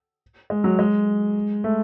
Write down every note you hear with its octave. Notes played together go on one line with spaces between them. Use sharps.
G#3
F#3
G#3
A3